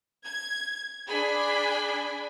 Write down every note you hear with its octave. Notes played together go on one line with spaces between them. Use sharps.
G#6
D4 G#4 G#5 B5